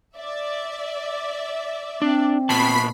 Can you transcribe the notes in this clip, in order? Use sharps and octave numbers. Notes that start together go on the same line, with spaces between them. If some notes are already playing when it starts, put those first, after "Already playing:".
D5 E5
C4 D4
A#2 B3 A5 B5 B6 C7